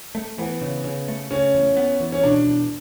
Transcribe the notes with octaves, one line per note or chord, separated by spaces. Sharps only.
A3
E3 B3
C#3
C#3
A3
C#3 C#4
E2
B3
E3
C#4
B2 D4
E2